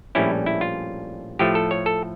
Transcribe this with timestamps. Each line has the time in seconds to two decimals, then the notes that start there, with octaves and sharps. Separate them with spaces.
0.15 A#1 A2 G3 C#4 E4
0.46 E4
0.61 F4
1.39 A2 F3 A3 G4
1.55 A4
1.71 C#5
1.86 A4